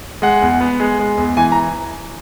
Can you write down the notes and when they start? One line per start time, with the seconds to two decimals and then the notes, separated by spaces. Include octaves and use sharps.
0.22 G#3 F#5
0.42 E2
0.61 B3
0.80 G#3
0.99 G#3
1.18 E2
1.37 E3 G#5
1.52 A#5